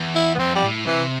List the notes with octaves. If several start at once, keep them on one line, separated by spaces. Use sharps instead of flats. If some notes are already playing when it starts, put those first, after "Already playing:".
Already playing: E2
E4
B3
F2 C4
G3
A2
C3 E3